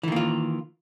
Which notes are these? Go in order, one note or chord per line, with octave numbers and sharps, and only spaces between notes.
D#3 E3 A#3 F4